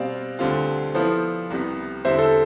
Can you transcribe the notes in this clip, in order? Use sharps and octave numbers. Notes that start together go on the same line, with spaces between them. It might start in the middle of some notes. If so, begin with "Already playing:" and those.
Already playing: B2 G3 C4 D5 F5
D2 D3 G3 C4 F4
F3 B3 E4 A4 C5
C2 C3 G3 B3
E2 D3 G3 C4 C5 E5
A4 C5